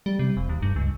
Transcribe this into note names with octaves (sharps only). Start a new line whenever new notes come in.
G3
C3
F1
D#2
G2
C#2